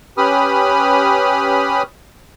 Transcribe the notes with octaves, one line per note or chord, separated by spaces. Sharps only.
C#4 G4 B4 B5 D#6 F6